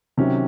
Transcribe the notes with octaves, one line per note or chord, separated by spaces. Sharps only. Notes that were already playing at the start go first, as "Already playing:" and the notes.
C3 D#3 F#3 C#4